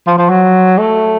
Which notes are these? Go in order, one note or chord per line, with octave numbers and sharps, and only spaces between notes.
F3
F3
F#3
A3